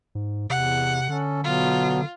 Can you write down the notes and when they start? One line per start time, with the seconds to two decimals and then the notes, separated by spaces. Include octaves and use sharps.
0.15 G#2
0.50 E2 C3 F#5
1.09 D3 C#4 A4
1.44 B2 F#3 B3 F4